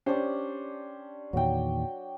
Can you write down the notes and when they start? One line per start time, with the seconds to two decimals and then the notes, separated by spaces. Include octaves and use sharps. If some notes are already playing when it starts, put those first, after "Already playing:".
0.06 C#4 D4 G4 C5
1.33 E2 A#2 D#3 F#3 G5